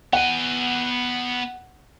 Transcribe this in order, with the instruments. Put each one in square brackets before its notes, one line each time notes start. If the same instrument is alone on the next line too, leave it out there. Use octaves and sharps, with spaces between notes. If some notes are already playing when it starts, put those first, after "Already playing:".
[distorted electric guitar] B3 G#5 [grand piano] F#5